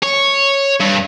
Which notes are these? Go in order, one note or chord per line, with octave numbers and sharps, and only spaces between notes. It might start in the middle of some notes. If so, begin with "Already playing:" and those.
C#5
G2